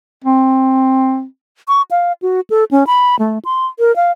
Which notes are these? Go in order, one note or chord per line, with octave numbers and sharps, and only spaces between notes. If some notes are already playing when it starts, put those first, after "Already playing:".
C4
C#6
F5
F#4
A4
C#4
B5
A3
C6
A#4
F5